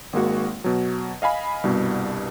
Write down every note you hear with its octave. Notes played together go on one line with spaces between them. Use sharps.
G#1 G#3 A#3 F#4
B2 F#3
D#5 F5 G#5 B5
C2 G2 B2